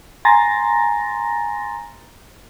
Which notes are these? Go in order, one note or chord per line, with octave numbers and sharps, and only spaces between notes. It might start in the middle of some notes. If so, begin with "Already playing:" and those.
G#5 A#5 C6 A6 A#6